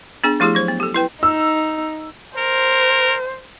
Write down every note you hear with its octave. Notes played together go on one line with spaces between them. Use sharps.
B3 D4 G#4 G#5
F3 A3 E4 G4 G#4
F#3 C5
B3
G4 A4
E4 B4 G5
D#4 E6
A#4 C5